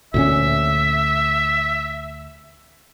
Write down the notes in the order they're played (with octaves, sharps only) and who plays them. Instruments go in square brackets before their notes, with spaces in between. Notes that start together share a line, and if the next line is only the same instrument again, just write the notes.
[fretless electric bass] D2 A#2 C#4 [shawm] E5